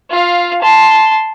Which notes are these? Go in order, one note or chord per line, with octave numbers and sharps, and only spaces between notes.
F4 F5
A5 C6